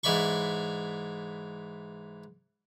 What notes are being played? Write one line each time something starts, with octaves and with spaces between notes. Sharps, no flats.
G#2 E3 D5 B5 C#6